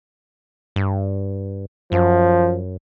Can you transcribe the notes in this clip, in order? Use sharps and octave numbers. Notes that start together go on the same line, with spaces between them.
G2
F#2 F3